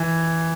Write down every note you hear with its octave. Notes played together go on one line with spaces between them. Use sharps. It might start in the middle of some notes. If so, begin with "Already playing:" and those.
Already playing: E3